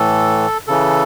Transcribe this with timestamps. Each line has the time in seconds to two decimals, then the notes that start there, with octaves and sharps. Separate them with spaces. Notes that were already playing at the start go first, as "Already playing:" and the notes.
Already playing: A2 E3 A4
0.68 C#3 E3 A4